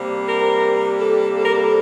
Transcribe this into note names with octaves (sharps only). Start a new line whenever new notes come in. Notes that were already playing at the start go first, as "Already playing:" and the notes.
Already playing: C3 G3 A#3
A#4
A4
A4
A#4
A4